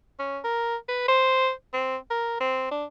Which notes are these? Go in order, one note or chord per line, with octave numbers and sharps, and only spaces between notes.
C#4
A#4
B4
C5
C4
A#4
C4
D4